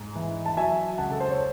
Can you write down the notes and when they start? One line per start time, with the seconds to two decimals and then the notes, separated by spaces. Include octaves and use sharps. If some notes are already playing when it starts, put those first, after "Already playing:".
Already playing: G#2
0.15 E3
0.46 A5
0.56 F#3 E5 G#5
0.98 C#2 F#5 A5
1.11 A4
1.20 C5
1.31 C#5